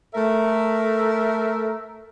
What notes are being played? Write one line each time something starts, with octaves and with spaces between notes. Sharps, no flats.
A3 A4 A#4 E5